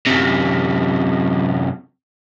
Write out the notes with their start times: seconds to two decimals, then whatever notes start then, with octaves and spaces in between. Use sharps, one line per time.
0.07 F#2 C3